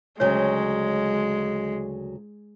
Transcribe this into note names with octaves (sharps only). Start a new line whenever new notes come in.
D2 C#3 F#3 G#3 C#5